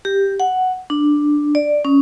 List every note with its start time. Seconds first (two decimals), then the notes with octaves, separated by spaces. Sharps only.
0.05 G4
0.40 F#5
0.90 D4
1.55 D5
1.85 C#4